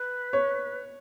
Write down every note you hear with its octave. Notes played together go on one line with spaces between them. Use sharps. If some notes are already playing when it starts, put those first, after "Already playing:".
Already playing: B4
C#5